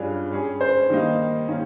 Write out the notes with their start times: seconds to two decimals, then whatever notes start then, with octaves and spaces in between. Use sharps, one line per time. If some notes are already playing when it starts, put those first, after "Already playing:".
Already playing: G2 G3 C#4 F4 G#4
0.31 G3 C#4 G#4
0.61 C5
0.90 D#3 G3 A#3 D#4
1.48 D#3 A#3 C#4